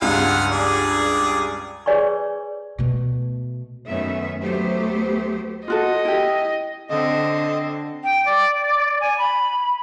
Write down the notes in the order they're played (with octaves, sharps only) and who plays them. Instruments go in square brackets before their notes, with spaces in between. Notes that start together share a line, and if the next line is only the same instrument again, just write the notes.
[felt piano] C#2 G2 [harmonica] F4 F#5 G#5
[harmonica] G#4 D5
[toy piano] G#4 B4 C#5 D5 G#5 C#6
[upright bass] B2 A3
[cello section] F#2 D#3 A3 B3 C#4 E5
D2 F#3 A3 B3 G4 C5
[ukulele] F4 F#4 A4 [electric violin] D#5
[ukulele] E4 G4
[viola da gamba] D3 C4 [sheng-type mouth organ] D#5
[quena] G5
D5
G#5
B5